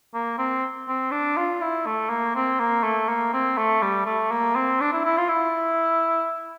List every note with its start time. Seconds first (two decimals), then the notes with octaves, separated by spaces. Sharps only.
0.14 A#3
0.38 C4
0.88 C4
1.11 D4
1.37 F4
1.61 E4
1.86 A3
2.09 A#3
2.35 C4
2.60 A#3
2.83 A3
3.08 A#3
3.33 C4
3.58 A3
3.82 G3
4.06 A3
4.31 A#3
4.56 C4
4.80 D4
4.93 E4
5.04 E4
5.17 F4
5.28 E4